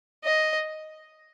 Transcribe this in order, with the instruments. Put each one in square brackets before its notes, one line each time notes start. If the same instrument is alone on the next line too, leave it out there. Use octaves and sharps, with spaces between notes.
[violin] D#5